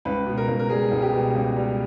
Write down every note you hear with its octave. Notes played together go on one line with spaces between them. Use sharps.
C#2 B4
B2
A#4
C#2
A#4
G3 G#4
C#2
G4
B2
C#2
G3